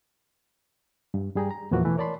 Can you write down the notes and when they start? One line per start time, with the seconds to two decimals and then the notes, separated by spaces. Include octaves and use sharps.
1.14 G2
1.35 G2 G3 G#4 G5 A#5
1.51 A#5
1.71 E2 A#2 E3 F3 F#4 A#4
1.84 B2 E3 A3
1.98 A#4 C#5 D5 A5 B5 C6